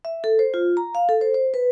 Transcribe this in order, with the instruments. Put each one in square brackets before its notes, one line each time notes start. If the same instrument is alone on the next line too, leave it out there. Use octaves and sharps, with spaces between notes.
[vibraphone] E5
A4
C5
F4
A#5
F5
A4
C5
C5
B4